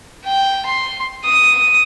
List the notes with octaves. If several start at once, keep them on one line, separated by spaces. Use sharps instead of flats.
G5
C6
D#6